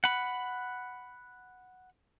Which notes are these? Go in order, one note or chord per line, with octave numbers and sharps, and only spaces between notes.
F#5 B5